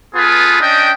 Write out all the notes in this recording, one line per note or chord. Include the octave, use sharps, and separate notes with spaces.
B3 F4 G#4 A4 B4
C#4 D4 D#5 G5